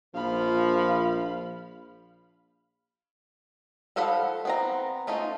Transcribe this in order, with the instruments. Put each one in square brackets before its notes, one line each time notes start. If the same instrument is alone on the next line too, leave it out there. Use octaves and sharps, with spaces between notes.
[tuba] A#1 [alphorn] F3 [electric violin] F5 B5
[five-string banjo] F3 A4 F5 F#5 B5
B3 C4 A#5
A3 C#4 D#4 F4